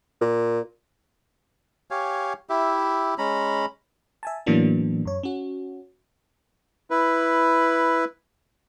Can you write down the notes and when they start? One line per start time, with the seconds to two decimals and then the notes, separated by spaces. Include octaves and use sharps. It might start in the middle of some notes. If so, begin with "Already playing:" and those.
0.21 A#2
1.91 G4 C#5 F5 G#5
2.50 E4 G4 E5
3.18 G#3 C#4 A#5 B5
4.23 E5 G#5 A5
4.46 A2 E3 F#3 A#3 B3 D4
5.05 F#2 C#5
5.23 C#4 F#4
6.90 E4 B4